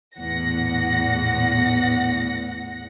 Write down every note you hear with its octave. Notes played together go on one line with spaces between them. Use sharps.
A#1 E2 A2 F#5 A#6